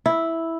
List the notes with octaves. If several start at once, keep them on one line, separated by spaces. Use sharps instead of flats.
E4